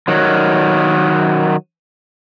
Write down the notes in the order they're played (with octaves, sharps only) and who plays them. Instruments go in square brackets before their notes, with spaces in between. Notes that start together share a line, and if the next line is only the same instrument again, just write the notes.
[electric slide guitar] D#3 F#3